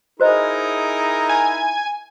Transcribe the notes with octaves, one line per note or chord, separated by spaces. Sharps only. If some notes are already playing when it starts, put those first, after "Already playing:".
D#4 E4 F#4 G#4 A#4 C5 D#5
G#5